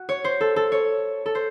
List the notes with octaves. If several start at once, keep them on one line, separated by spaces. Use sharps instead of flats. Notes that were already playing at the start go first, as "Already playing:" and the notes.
Already playing: F#4
C#5
C5
A4
A4
C#5
A4
C5